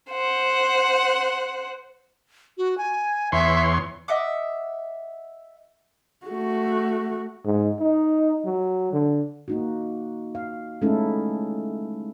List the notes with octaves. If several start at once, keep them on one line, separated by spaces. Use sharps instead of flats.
C5 F#5
F#4
G#5
E2 C#5 E5 C6
D#5 E5 F#5 D6
A3 F#4
G#2
D#4
F#3
D3
A#3 D#4 F#4
F5
G#3 A3 C#4 D#4 E4 A4